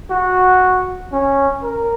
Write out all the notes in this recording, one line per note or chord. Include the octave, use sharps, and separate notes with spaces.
F#4
C#4
A#4